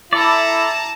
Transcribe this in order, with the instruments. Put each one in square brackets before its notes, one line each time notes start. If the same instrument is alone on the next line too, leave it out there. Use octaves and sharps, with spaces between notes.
[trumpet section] E4 [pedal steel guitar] A4 D5 [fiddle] A5 A#5